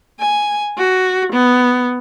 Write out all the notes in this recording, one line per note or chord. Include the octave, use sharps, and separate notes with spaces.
G#5
F#4
B3